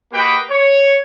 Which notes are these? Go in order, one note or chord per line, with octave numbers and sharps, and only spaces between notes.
A#3 F#4 G4 B4 D#5 G5
C#5